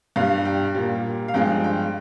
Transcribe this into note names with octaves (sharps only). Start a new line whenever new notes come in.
G2 G3 F5
G5
A#2 G3
F5
G2 F3 G#3 G5
G5